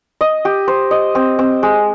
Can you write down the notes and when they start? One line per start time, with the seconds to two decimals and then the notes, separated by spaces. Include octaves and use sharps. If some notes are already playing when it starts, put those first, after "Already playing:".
0.21 D#5
0.45 G4
0.68 C5
0.91 D#5
1.15 C4
1.39 C4
1.63 G#3